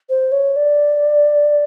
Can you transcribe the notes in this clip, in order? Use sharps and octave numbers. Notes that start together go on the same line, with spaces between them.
C5
C#5
D5